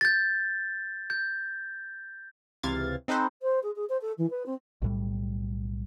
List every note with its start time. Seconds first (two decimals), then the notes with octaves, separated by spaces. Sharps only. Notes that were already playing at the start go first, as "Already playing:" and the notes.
0.01 G6 A6
1.10 G6
2.63 C#2 C3 E3 F5 G#6 A6
3.08 C4 D#4 A4 B4 C5
3.42 C5
3.62 G#4
3.75 G#4
3.89 C5
4.01 A4
4.18 E3
4.30 B4
4.45 C4
4.82 B1 A2 G3